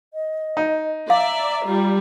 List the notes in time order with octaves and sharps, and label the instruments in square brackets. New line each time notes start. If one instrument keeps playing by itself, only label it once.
[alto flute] D#5
[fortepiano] D#4
[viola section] D5 E5 [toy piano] F5 [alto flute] A#5
[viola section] G3 F4